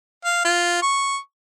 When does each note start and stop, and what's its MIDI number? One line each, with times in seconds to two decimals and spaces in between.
0.25 0.44 77
0.45 0.82 65
0.82 1.18 85